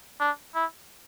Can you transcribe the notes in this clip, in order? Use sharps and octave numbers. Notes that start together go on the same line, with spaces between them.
D4
E4